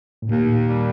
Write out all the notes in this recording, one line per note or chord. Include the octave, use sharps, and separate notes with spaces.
A2
D#2 A#2
G3